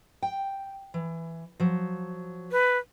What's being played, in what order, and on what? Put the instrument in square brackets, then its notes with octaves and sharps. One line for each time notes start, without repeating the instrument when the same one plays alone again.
[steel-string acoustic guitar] G5
E3
F3 F#3
[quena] B4